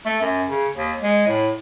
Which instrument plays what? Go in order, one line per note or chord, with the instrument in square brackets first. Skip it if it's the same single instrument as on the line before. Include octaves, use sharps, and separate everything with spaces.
[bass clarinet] A3
F#2
C#3
D#2
G#3
A2